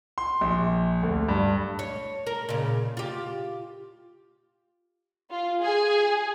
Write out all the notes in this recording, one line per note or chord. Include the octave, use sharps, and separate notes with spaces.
C6
A#1
D2
G2
C#5
A#4
A#2 C#3
F4 G4
F4
G#4